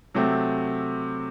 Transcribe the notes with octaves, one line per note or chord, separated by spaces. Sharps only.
C3 F#3 A3 C4